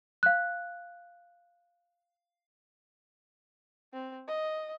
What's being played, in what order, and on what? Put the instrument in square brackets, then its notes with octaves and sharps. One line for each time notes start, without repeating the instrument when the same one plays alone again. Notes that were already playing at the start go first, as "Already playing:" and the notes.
[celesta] F5 F#6
[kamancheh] C4
D#5